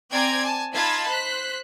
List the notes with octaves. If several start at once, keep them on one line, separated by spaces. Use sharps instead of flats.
C4 D5 G5 G#5 A#5 G#6
G#5 A5
D#4 F4 A5 B5 G#6 A6
C5 F#6 B6